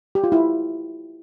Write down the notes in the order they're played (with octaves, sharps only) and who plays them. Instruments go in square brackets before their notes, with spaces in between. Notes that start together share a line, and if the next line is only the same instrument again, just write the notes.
[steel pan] G4
F4
E4